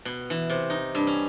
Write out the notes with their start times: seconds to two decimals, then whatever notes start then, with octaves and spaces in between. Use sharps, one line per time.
0.05 B2
0.30 E3
0.50 C3
0.70 D#4
0.95 G2
1.07 C#4